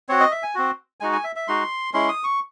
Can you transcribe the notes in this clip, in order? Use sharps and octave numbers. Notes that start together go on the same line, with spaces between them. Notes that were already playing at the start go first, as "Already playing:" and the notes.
C4 F#4 C#5
D#5
E5
G#5
C4 F#4
G#3 D#4 F#4 G#5
G#5
E5
E5
G#3 D#4 F#4 C6
G#3 C#4 E4 C6
D#6
C#6